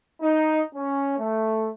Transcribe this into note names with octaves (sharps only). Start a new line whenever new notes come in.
D#4
C#4
A3